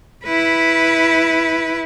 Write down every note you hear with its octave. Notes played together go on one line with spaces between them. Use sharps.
E4 B4